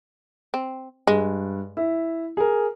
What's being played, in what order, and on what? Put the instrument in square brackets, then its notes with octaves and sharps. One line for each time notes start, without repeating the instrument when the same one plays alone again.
[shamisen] C4
[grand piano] G2 [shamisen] G#3
[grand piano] E4
G#4 A#4